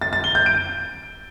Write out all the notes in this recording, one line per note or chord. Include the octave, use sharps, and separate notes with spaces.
A6
A6
G7
G6
D7